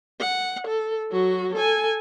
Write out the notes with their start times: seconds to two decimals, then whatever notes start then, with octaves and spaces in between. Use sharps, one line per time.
0.20 F#5
0.67 A4
1.12 F#3 F#4
1.55 A4 G#5